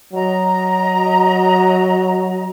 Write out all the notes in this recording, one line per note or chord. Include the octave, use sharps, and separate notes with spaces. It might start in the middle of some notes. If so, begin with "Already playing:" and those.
F#3 D#5 A#5